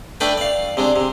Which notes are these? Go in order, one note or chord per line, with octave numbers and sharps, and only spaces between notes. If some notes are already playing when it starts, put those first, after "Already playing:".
A3 D4 B4 D5 G5
D5 F5
C3 G#3 D4
C3